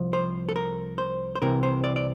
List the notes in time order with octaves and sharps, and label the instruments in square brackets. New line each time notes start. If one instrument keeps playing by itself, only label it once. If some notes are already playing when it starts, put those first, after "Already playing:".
Already playing: [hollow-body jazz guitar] C2 F3
C5
A4
A#4
C5
C5
C2 C3 E3 A#4
C5
D5
D5